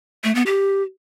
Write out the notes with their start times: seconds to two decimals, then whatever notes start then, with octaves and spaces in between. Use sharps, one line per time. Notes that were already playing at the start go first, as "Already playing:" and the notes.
0.24 A3
0.35 B3
0.46 G4